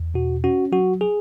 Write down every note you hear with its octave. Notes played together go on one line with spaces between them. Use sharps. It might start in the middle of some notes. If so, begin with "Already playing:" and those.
Already playing: E2
B2 F#4
C#4 F#4
F#3 F#4
G#4